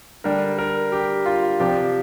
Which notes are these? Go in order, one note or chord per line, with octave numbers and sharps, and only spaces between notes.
D3 G3 D4 A#4
A#4
G4
F4
C3 F3 D4 G4